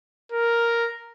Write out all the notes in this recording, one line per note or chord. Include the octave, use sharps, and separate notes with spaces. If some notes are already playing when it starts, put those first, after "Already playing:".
A#4